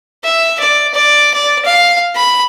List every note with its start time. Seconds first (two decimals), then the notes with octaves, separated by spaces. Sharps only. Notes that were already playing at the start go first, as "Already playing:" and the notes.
0.24 E5
0.60 D5
0.94 D5
1.34 D5
1.65 F5
2.16 B5